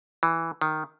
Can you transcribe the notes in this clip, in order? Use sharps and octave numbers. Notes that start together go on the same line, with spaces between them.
E3
D#3